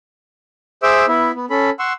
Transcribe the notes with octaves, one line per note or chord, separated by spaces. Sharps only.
G#4 C5 E5 D6 E6
B3 E4 E5
B3
C#4 A4 B5
F#5 C6 C#6 E6